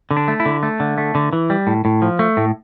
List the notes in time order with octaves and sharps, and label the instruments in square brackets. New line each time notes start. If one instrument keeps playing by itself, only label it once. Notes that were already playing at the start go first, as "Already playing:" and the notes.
[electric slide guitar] D3
D4
A3
E4
D3
A3
D3
A3
D3
E3
G3
A2
A2
F3
A3
A2